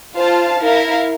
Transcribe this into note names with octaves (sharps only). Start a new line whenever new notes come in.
F4 C5 F5 A5
E4 A#4 F5